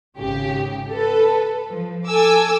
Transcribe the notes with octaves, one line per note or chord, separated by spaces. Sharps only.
G#1 C#3 G4
A4 B4
F3
A4 G#5 D6 E6